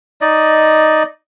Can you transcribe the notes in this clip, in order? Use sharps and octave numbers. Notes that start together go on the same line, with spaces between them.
D#4 D5 D#5